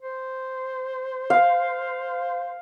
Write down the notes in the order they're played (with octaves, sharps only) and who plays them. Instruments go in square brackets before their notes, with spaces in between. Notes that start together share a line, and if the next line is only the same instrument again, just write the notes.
[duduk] C5
[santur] F5